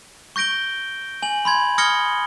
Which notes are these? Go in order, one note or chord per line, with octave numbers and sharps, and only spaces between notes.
C#6 G6 A#6 D7 G7
G#5 F#7
B5 C6 G#6
D#6 F6 G#6 A#6 C#7 G7